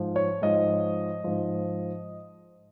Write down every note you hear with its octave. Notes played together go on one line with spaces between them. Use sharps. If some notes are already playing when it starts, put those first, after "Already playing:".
Already playing: G#2 F3
C#5
G#2 F3 D#5
G#2 F3